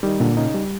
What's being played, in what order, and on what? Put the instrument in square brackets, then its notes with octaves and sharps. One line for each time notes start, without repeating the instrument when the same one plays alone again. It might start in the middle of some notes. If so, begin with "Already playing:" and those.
[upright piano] D#3 D#4 [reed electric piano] G3
[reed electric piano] A#2 [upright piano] D3 D4
[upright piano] C#3 C#4 [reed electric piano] D#4
[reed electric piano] G3